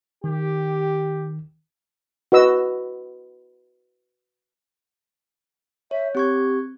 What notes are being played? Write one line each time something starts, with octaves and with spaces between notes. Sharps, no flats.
D#3 G4
F#4 B4 D#5 E6
C#5 E5
C4 G4 C#6 G#6